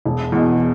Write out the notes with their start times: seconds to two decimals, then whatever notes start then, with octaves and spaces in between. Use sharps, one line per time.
0.06 E1
0.32 E2 B2